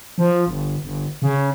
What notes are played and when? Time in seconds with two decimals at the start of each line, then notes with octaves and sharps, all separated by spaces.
0.18 F3
0.47 G1
0.83 G1
1.22 C#3